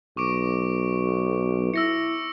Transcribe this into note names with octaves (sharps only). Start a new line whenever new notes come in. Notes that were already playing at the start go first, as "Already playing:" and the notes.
B1 C#6 D6 D7
E4 E6 A#6 C#7